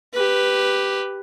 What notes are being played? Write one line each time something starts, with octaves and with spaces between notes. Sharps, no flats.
G4 B4